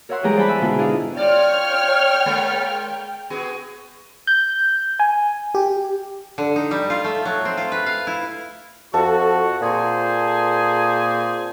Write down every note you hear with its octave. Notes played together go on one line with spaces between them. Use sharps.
A#4 C#5 E5 F#5 C6
E2 G3 G#3 G4 G#4 A#5
C5 D5 F#5 G#5 A5 B5
E5
G#2 B2 D3 B3 F4
D4 E4 G#4 D5 D#5 F5
F4 C#5 D5 G5 F6
G#3 A#3
B3 F#4 G#4
G6
G#5
G4
D3
D#4
G3
F4
A3
F#3
C4
F4
B4
F5
E4
F2 F#4 A4
A#2 C4 G#4 C5